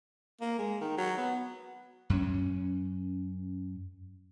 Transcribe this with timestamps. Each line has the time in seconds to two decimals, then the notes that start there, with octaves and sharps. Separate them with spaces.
0.41 A#3
0.59 G#3
0.81 D#3
0.98 F#3
1.17 B3
2.10 F#2 C#4